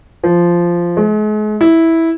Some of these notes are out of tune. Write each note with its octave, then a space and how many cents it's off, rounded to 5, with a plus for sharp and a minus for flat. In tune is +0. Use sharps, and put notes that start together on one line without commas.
F3 -10
G#3 +40
E4 -10